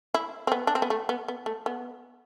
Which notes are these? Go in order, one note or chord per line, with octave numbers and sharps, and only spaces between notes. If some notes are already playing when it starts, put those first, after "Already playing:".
E4
C4
B3
D4
C4
B3
A3
B3
B3
A3
B3